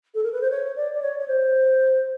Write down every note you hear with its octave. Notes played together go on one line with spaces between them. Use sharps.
A4
A#4
B4
C5
C#5
D5
D5
C#5
C#5
C5